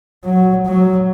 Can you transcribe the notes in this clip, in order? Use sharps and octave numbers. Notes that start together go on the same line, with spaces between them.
F#3
F#3